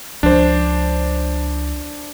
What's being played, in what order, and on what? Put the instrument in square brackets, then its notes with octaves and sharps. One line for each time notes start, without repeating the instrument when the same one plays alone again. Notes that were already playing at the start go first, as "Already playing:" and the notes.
[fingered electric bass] C#2 F3 [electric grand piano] D4 C5